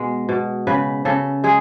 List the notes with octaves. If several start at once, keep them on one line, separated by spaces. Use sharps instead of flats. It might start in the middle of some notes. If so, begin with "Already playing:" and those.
Already playing: B2 G#3
B2
C#3 B4
C#3 A4
G#3 G#4